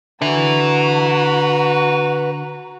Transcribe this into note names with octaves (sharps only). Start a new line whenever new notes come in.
D3 F#4 B4 E5 A#5